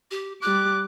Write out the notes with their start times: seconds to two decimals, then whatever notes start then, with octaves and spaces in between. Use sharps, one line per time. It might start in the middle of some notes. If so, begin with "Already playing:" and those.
0.11 G4
0.42 G3 D6 F#6